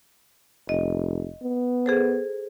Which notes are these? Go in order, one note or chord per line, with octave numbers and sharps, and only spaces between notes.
F1 D#5
B3
G#4 A4 C5